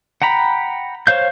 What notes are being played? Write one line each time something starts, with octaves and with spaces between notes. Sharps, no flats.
F#5 G5 A#5 B5
C5 C#5 F5 G6